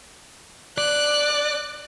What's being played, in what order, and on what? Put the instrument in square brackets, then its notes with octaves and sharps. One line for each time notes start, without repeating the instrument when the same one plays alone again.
[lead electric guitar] D5 [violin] F#6